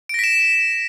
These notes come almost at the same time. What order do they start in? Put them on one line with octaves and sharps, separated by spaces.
D7 A#6 B6 E7